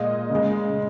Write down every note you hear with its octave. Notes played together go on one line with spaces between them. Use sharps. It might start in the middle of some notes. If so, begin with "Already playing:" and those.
Already playing: A#2 G#3 D#5
C#3
G#3